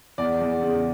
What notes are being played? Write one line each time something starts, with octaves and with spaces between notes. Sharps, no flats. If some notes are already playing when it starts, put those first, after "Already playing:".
E2 D5
E2
C#3